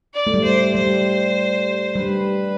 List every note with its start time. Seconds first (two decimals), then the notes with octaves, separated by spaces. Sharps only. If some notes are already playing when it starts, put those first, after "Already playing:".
0.14 D5
0.27 A3
0.34 G3
0.44 C5
0.75 G3 C5
1.95 G3 B4